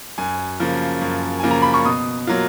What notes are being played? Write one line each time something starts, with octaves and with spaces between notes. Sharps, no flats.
F#2 G#5
C#3 F3 A#3
F#2
C#3 F3 A#3 G#5
A#5
B5
C#6
B2 D#6
F#3 A#3 F4